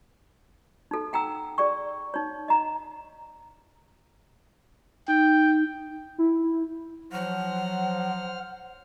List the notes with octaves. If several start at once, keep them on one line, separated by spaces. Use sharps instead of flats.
D#4 A4
F#5 G5 A#5 E6
G#4 D5 G5 C#6
D#4 C#5
D#5 A#5
D#4 G5
E4
F3 F#3 C5 F#5 F6